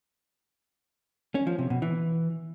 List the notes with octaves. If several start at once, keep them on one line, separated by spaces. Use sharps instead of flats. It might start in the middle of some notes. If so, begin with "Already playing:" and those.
C#4
F3
C3
B2
E3